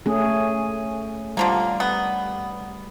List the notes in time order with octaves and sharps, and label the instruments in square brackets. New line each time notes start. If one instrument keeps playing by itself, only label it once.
[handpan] A3 C#4 G#4
[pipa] D3 F3 A#3 [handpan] G3
[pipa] B3